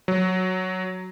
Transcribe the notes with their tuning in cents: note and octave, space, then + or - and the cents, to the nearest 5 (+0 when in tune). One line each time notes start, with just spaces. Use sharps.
F#3 +0